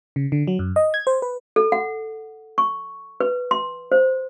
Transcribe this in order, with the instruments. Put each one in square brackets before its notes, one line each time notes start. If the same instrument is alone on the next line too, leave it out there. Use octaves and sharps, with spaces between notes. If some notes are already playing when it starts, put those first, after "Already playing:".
[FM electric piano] C#3
D3
F#3
F#2
D#5
G#6
C5
B4
[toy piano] A4
F#5
C#6
B4
C6
C5